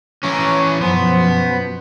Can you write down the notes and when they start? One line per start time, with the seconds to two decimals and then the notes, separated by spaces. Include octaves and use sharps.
0.23 E3 C#4 C#5 A#5 D6
0.81 F#2 B2 F3 B3 C5